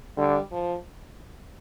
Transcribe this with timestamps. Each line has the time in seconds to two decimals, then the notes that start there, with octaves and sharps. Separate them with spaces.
0.17 D3 G3
0.52 F3